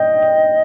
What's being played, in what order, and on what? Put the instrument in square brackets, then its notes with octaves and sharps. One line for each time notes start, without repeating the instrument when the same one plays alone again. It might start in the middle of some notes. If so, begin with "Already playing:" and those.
Already playing: [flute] D#5 [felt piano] G5